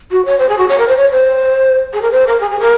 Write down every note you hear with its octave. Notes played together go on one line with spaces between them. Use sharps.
F#4
C#5
C5
G#4
F#4
C#5
A#4
C5
C#5
C5
G#4
A#4
C5
A#4
G#4
G#4
A#4